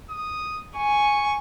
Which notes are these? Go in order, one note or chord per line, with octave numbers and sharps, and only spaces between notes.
D#6
G#5 C#6